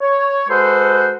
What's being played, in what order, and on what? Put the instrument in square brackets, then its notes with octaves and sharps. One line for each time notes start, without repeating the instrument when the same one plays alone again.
[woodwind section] C#5
G#3 F#4 A4 B4 C5